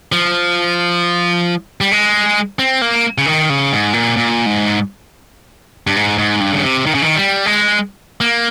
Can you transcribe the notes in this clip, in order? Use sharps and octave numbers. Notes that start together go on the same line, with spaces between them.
F3
G3
G#3
C4
A#3
C#3
D#3
C#3
G#2
A#2
A#2
G#2
G2
G#2
G#2
G2
C#3
C3
D#3
C#3
D#3
G3
G#3
A#3